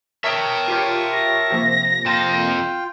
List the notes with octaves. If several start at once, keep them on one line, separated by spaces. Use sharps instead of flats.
A#4 C#5 E5 G5 A5 A#5 C#6 D#6
F4 G4 C#5
A#6
C3 F3 A#3
F2 F4 G5 A5